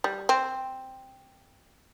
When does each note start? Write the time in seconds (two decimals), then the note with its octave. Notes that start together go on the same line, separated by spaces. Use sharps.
0.04 G3
0.29 C4